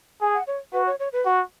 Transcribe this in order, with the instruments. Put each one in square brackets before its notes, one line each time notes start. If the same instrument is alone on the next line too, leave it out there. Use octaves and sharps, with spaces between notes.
[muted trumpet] G#4 [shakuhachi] G#5
[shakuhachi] F#5
C#5
[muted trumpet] F#4 [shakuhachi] B4
[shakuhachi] C#5
C#5
B4
[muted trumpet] F#4